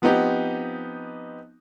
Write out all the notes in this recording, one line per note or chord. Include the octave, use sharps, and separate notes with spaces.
F3 B3 C4 D#4 G4